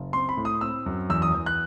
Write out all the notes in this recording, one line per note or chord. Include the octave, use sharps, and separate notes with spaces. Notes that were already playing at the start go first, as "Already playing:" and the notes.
Already playing: F#1
C4 C6
B5
A2
D#6
C4 E6
F#2
E2 E6
D#6
E2
F#6